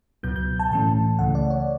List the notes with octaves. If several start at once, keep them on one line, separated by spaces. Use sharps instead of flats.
C#2 B2 F#3 B3 G6
G6
A5
A2 E3 A3 C#4 A5
C#2 C#3 E3 A3 F#5
D5
C#5